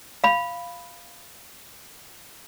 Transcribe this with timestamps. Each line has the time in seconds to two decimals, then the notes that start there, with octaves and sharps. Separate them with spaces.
0.24 F5 B5